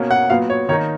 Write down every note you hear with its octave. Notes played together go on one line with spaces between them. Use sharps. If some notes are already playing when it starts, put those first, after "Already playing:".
Already playing: B2 A#3 C#4
F#5
A#2 F#3 B3 F5
C#5
D#3 A#3 D#4 C#5